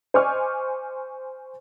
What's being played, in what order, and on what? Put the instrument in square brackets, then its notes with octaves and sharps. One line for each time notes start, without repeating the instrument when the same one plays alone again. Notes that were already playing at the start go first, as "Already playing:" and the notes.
[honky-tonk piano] C5 D#5 G#5 C#6 D6 F6